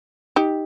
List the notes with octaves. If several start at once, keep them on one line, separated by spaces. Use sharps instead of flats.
D#4 G4